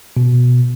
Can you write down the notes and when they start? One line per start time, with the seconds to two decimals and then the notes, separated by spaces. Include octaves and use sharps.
0.17 B2